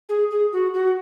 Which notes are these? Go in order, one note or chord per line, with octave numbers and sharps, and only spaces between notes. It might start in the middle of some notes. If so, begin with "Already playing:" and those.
G#4
G#4
F#4
F#4